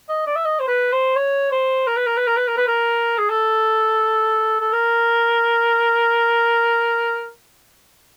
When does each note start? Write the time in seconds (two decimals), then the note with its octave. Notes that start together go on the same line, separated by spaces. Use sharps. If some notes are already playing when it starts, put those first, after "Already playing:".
0.08 D#5
0.27 D5
0.35 E5
0.45 D#5
0.60 C5
0.68 B4
0.92 C5
1.16 C#5
1.52 C5
1.87 A#4
1.97 B4
2.07 A#4
2.18 B4
2.27 A#4
2.37 B4
2.48 A#4
2.57 B4
2.67 A#4
3.18 G#4
3.30 A4
4.61 A4
4.72 A#4